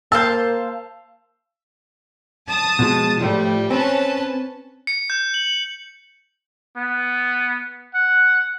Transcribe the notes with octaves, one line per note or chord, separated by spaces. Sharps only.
A#3 C5 F5 A5 E6
A5 D#6
B2 F3 G#3
A2 F3 G3 A3
C4 C#4 B4 A5
C#7
G6
F#7
B3
F#5